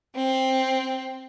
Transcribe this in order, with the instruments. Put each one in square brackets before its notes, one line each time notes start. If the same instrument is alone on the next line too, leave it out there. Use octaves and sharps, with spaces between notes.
[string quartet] C4